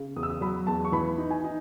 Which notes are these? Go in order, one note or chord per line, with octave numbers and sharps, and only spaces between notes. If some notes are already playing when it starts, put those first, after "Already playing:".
Already playing: C#3
E2 D#6
E6
D#6
F#3 B5
E2 A5
C#6
E3 B5
D#4
G#5
D#4